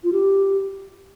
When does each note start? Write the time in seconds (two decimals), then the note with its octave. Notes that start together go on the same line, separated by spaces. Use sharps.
0.04 F4
0.13 G4